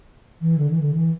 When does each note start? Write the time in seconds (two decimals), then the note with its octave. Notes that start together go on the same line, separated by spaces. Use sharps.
0.41 E3
0.58 D3
0.70 E3
0.81 D3
0.94 E3